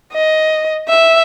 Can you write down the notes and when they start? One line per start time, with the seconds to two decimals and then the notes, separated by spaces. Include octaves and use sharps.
0.13 D#5
0.89 E5